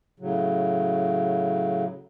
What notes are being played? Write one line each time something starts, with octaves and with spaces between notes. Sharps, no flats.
A2 C#3 F#3